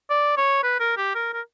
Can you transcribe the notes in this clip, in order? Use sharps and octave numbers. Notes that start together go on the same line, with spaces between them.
D5
C#5
B4
A#4
G4
A#4
A#4